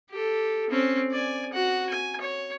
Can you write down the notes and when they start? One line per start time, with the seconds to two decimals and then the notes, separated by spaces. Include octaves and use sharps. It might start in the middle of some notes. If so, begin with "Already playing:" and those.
0.10 G4 A4
0.70 C4 C#4
1.12 D5 G#5
1.53 F#4 F#5
1.90 G#5
2.21 C#5